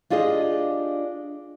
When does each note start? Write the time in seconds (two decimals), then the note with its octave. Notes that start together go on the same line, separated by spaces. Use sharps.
0.10 D4 F4 G4 G#4 D#5